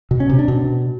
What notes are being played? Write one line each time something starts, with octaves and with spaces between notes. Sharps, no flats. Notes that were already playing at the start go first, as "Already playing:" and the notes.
B2
C#4
C3
D4
B2